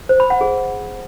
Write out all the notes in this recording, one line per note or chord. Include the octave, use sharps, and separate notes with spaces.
C5
B5
F#5
G#4